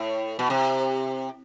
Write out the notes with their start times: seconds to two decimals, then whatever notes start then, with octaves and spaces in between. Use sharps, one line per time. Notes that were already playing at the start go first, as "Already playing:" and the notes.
Already playing: A2
0.39 B2
0.50 C3